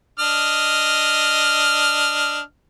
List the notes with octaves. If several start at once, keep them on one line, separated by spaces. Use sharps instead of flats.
D4 D#5 F6